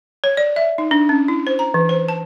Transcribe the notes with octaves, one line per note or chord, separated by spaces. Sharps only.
C#5
D5
E5
D#4
D4
C#4
E4
C5
A#5
E3
C5
A5